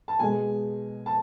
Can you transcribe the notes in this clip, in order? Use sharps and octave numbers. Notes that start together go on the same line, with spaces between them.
A5
B2 G#3 G#5
A5